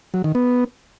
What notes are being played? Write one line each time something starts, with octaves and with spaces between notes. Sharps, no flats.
F#3
D#3
B3